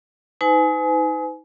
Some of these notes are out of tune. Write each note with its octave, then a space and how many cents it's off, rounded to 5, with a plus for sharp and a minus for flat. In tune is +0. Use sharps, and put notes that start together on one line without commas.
D#4 +35 B4 +45 G#5 +25